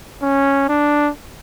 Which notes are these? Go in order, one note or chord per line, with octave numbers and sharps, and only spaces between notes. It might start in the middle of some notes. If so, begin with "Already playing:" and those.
C#4
D4